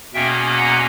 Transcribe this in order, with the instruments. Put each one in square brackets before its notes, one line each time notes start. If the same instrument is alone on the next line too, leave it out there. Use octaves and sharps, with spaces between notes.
[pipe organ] E2 B2 A#3 C#4 E5 G5
F#5 A#5